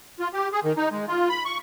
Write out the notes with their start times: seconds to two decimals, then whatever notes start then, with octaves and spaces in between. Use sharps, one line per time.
0.20 F4
0.33 G4
0.52 G#4
0.64 D#3
0.77 D#4
0.92 G#3
1.08 F4
1.29 B5
1.45 C#6